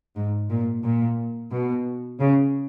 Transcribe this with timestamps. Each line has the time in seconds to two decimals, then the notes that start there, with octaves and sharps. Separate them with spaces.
0.16 G#2
0.50 A#2
0.84 A#2
1.52 B2
2.19 C#3